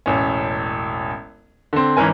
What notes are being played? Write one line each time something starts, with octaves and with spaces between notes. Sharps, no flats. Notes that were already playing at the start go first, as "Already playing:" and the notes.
E1 A1 C#4
D3 C4
G#1 E3 C#4 A#4 G#5